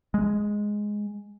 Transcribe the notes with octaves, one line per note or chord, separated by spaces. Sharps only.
G#3